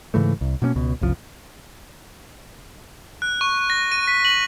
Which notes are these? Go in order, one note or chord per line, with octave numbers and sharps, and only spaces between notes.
G#2 C#3 E3 A3
C2
B2 A#3 B3 C#4
C#2 B2
F#1 C2 F3
F#6
C#6
A#6
D#7
B6
F#7